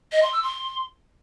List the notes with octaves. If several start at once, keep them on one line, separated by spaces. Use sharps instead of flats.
D#5
C6
E6
C6